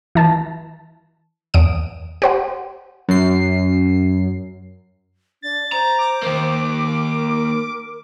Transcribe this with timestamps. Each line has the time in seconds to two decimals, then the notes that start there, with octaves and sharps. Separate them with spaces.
0.15 E3 A5
1.54 E2 D#6 D7
2.22 G4 C5 F#5
3.08 F#2 C7
5.42 D4 A6
5.72 C5 A#5
5.99 D6
6.23 D#3 A#3
6.85 A#4